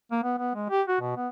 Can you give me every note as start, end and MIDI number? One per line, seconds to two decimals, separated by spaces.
0.11 0.21 58
0.23 0.35 59
0.39 0.54 59
0.55 0.69 56
0.70 0.83 67
0.88 0.99 66
1.01 1.17 47
1.17 1.29 59